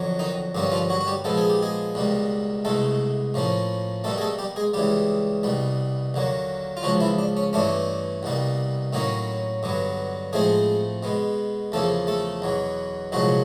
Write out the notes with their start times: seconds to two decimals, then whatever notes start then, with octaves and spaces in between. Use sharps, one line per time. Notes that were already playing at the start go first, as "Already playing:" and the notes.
Already playing: F2 D3 F#3
0.19 D#3 D#4
0.55 G2 D3 G3 A#3 C#4
0.72 F3 F4
0.90 F#3 F#4
1.01 F#4
1.07 G3 G4
1.24 A#2 F3 G#3 B3 A4
1.38 G#4
1.50 G4
1.63 G#3 G#4
1.95 C#2 B2 G3 A#3
2.65 C2 B2 G#3 A3 A4
3.34 A2 F3 A#3 C#4
4.04 B2 G3 A3 A#3 A4
4.18 G#4
4.21 A3 A4
4.39 G3 G4
4.56 G#3 G#4
4.73 C#2 C#3 E3 G3 G4
5.43 C2 B2 G3
6.14 D#2 D3 F#3 A#3
6.77 F4
6.83 C#2 C#3 F3 F#3 F#4
7.01 E3 E4
7.19 D4
7.37 C#4
7.53 G2 E3 A3 C#4 D4
8.23 C2 B2 G3 A#3
8.93 A2 D#3 F#3 A#3 C#4 D#4
9.63 G2 D3 F#3 B3
10.33 A2 F3 G#3 A3 C4 G#4
11.03 B2 G#3 B3
11.72 E2 C#3 F3 A3 A#3 A4
12.07 A3 A4
12.42 E2 B2 F#3
13.12 C2 A#2 F3 F#3 G#3 F#4